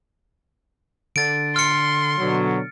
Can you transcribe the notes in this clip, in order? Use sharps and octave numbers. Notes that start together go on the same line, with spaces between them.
D3 A6 D7
C6 F6 C#7
B2 D3 F#3